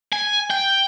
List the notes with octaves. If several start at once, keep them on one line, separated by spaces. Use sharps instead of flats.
G#5
G5